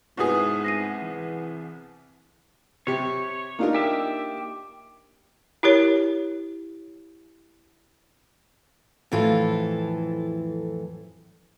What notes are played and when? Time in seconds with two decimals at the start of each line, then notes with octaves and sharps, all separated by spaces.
0.17 C2 G#2 B3 E4 F4 G#4 D#6
0.64 A#6 C7 D#7
1.02 E3
2.87 C3 G4 C#5
3.59 A#3 D4 D#4 F4 A#4
3.74 G4 E5
5.63 E4 G4 A#4 C#5
9.12 F2 A2 E3 F4 A4